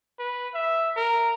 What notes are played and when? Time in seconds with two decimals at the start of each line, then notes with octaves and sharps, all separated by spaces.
0.19 B4
0.54 E5
0.97 A#4